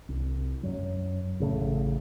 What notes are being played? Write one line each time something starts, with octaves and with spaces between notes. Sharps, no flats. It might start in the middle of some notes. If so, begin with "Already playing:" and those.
C2
F#2 F#3
A1 C#3 A3